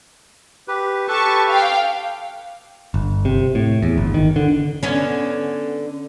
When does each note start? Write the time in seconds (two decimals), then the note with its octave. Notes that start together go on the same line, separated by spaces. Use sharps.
0.68 G4 B4
1.08 G4 A4 B4 A5 C#6
1.49 F5 G5
2.94 G1
3.25 C3
3.55 A2
3.83 E2
3.98 G1
4.14 D#3
4.36 D3
4.83 D3 B3 C#4